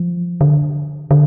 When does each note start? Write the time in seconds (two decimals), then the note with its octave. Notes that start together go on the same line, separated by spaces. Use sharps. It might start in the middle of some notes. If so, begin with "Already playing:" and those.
Already playing: F3
0.41 D3
1.11 D3